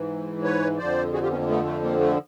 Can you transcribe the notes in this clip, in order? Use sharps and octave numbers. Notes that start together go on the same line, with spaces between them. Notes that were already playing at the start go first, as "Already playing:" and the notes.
Already playing: G#2 E3
B4 C#5
F2 D3 F3 C5 D5
F#4 G#4
F4 G4
B3 C#4
A#3
A3 B3
A3
A#3
A3